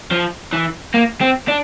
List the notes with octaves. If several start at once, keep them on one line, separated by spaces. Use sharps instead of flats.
F3
E3
A#3
C4
D4